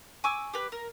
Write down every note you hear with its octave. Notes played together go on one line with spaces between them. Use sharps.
G#5 C#6 D6 E6
G4 B4
A#4